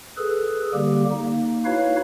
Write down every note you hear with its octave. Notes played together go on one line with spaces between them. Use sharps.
G#4 A4 B4
D3 G3 A#3 G4
A#3 D#4
D#4 E4 F#4 B4 C#5 F5